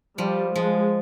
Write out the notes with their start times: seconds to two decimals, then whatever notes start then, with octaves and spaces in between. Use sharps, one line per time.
0.18 F3 G3
0.55 F3 G#3